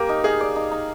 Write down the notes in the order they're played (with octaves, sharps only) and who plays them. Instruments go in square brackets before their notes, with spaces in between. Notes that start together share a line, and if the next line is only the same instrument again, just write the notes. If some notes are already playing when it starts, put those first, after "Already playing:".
Already playing: [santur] A#3 G4 [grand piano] A#4
[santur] D#4
[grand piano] G#4 [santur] F5
[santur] D5
D#4
D#4